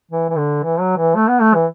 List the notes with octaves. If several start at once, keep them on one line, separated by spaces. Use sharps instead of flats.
E3
E3
D3
E3
F#3
E3
A3
B3
A3
E3